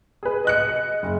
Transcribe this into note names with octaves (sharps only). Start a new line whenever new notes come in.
G#4 B4
D#5 F#6 C#7
F#1